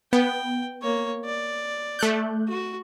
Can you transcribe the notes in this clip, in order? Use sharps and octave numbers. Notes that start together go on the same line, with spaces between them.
B3 G5
A#3 C#5
D5
A3 F#6 G6
F#4